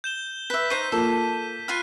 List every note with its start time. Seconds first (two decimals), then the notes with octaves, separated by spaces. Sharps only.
0.04 G6 E7 G7
0.50 B4 E5 B6
0.70 D#4 C5 C#6 D#7
0.92 A#3 F4 A4
1.68 F4 F5 B5 F6 F#6 D#7